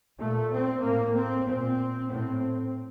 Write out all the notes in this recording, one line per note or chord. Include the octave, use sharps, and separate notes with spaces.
A#2 A3
C4
A2 A#3
C4
A#2 C4
A2 C4